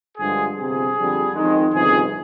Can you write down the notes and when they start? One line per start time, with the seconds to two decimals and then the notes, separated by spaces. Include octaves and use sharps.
0.18 G2 D3 F3 G#3 G#4
0.56 G1 F2 C3 G#4
0.95 F2 D3 G3
1.34 F2 D#3 G#3
1.73 G1 F2 C3 D#3 G#4